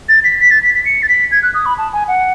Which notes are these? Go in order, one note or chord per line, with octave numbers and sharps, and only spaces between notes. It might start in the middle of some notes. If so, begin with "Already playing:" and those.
A6
B6
B6
A6
B6
B6
C#7
A6
B6
G#6
F#6
D#6
B5
A5
G#5
F#5